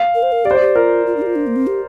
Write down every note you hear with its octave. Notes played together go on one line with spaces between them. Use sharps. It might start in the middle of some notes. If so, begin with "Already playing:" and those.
Already playing: F5
A#4
C5
A#4
G4 D5
C5
D5
G4
F4 A#4
F4
D4
G4
F4
D4
A#3
C4
G4